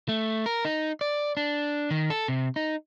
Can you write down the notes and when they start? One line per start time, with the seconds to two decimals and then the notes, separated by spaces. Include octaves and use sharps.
0.09 A3
0.46 A#4
0.65 D#4
1.01 D5
1.37 D4
1.91 D#3
2.10 A4
2.28 C3
2.56 D#4